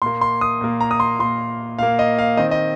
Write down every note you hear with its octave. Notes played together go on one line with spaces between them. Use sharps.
A#2 A#3 C6
C6
D#6
A#2 A#3
A#5
D#6
C6
A#2 A#3 C6
A#2 A#3 F5
D#5
F5
D#3 C4 D#5
D#5